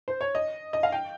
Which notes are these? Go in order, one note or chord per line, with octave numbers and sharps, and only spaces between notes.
C5
C#5
D#5
D#5
F5
G5